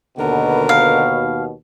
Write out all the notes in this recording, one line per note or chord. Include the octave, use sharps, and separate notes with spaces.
D#2 B2 D3 A#4 B4
F5